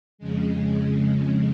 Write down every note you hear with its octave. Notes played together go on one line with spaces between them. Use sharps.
F2 C#3 G#3